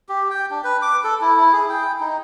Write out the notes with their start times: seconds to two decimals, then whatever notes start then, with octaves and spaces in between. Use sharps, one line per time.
0.09 G4
0.31 G5
0.51 D4
0.64 B4
0.82 D6
1.04 A4
1.21 E4
1.37 E4
1.52 G#4
1.69 G5
2.00 D#4